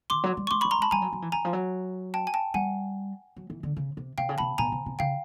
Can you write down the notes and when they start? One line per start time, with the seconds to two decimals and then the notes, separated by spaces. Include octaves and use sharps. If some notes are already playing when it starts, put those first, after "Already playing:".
0.10 D#3 C6 D6
0.24 F#3
0.37 G3
0.47 C#6
0.51 G#3 C6 D6
0.61 B5 C#6
0.65 G3
0.71 A#5 C6
0.79 G#3 A5 B5
0.91 G3 G#5 A#5
1.02 F#3
1.12 F#3
1.22 E3
1.32 E3 G#5 A#5
1.45 F3
1.53 F#3
2.14 G5 A5
2.27 G#5
2.34 G5 A5
2.54 G3 F#5 G#5
3.36 F#3
3.50 E3
3.63 D3
3.77 C#3
3.97 C3
4.18 C3 F5 G5
4.29 C#3
4.38 C3 A5 B5
4.58 B2 G#5 A#5
4.72 C3
4.86 C3
4.99 C#3 F5 G5